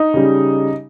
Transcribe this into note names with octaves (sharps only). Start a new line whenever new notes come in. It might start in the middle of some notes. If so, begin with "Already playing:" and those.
Already playing: D#4
C#3 G3